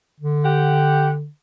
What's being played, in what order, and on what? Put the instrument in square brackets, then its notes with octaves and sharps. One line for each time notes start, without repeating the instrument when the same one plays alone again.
[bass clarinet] D3
[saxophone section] G4 F#5